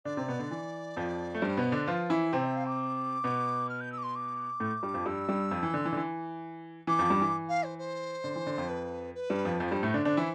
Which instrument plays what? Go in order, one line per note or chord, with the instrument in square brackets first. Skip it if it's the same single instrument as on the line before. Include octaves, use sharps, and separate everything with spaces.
[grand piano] D3 D4 [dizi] D5
[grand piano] C3 C4
B2 B3
D3
E3
F2 F3
A3
[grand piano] G2 G3 [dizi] C5
[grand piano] B2 B3
D3 D4
[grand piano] F3 F4 [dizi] B4
[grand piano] E3 E4 [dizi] C5
[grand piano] C3 C4 [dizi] C5
[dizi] E5
F5
D6
[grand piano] B2 B3
[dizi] F6
G6
E6
D6
C6
D6
[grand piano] A2 A3
G2 G3
F2 F3
[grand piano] G2 G3 [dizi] E6
[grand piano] G2 G3
F2 F3
E3
D3
E3
D3
E3
[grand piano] E3 [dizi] D6
[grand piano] F2 F3
G2 G3
E3
[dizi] F5
C5
C5
[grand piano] D3
E3
D3
F2 F3
[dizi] B4
B4
[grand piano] G2 G3
F2 F3
[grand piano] F2 F3 [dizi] C5
[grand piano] G2 G3
A2 A3
D3 D4
[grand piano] D3 D4 [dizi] C5
[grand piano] E3 E4